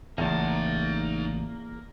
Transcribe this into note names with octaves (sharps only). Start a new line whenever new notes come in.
A1 E2 C#3 A#3 D#4 A5